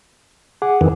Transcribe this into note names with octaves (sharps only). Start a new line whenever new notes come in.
G#4 F#5 D6
F2 D#3 E3